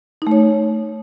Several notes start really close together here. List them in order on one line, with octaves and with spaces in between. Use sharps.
D#4 A3 C#5